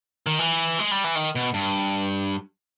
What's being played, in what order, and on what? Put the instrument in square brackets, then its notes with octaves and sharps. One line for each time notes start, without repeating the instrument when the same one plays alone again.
[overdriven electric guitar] D#3
E3
G#3
G3
E3
D#3
B2
G2